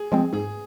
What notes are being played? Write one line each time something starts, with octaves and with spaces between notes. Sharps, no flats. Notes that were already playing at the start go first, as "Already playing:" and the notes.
Already playing: G#4
F3 G#3 C4
G#2 G#4